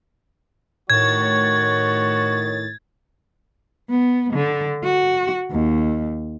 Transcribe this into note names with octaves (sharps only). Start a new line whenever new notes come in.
A2 D#3 F#4 C#5 G#6 A6
B3
D3
F#4
D#2